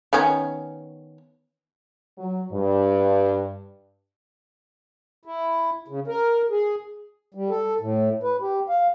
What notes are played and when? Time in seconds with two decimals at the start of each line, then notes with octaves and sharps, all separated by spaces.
0.13 D#3 B3 C#4
2.18 F#3
2.52 G2
5.25 E4
5.88 C#3
6.07 A#4
6.50 G#4
7.34 G3
7.50 A4
7.80 A2
8.23 B4
8.41 G4
8.69 F5